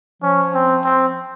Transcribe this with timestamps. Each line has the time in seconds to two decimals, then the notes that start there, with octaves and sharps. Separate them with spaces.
0.22 F3 C#4
0.54 C4
0.85 C4